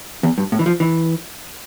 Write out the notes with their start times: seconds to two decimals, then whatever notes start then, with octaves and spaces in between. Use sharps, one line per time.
0.23 E2
0.38 G2
0.52 A2
0.59 E3
0.66 F3
0.80 E3